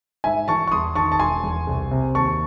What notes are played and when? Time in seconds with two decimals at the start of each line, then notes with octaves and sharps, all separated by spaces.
0.24 G#2 E5 G#5
0.48 E3 A5 C#6
0.67 C#6
0.72 E2 C6 D#6
0.95 D#3 A5 C#6
1.12 A5
1.19 E1 G#5 C6
1.43 E2
1.67 C2
1.91 C3
2.15 D#2 A5 C#6